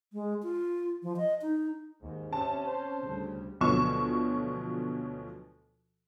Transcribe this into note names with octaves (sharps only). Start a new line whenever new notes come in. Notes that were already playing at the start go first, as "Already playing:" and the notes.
G#3
F4
F3
D#5
D#4
D#2 G#2
C3 C4 C#4 A5
C5
D2 C#3 G3
D2 B2 F3 F#3 C#6 E7